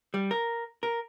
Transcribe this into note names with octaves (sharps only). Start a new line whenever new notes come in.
G3
A#4
A#4